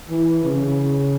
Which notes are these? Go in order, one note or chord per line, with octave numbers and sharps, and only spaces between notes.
E3
C#3